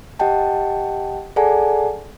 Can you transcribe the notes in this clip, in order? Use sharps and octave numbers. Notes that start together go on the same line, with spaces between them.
G4 D#5 F#5 G5 A5
G#4 A4 D5 F#5 G#5 A5